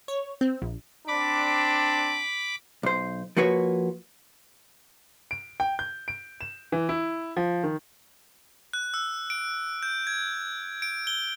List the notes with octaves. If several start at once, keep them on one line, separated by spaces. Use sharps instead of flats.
C#5
C4
A#1
C4 D4 B5 D6
B1 C5
F3 A#3 F#4 B4 C#5
D7
G5
G6
D7
E7
E3
E4
F3
D#3
F#6
E6
D7
G6
G#6
D7
G7